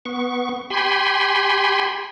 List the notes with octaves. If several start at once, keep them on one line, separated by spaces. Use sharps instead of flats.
B3 C#6
G4 G5 G#5 B5 C6